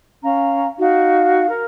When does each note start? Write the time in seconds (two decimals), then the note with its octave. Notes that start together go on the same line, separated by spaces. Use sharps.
0.22 C#4 F5 A#5
0.78 D#4 F#4 F5
1.48 A#4